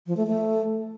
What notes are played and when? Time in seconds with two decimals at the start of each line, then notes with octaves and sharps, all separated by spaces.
0.07 F3
0.17 A3
0.27 A3